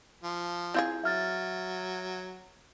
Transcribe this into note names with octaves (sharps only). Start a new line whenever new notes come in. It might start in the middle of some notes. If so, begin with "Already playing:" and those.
F3
C4 E4 F4 G#4 G6
F#3 E5 F6 A6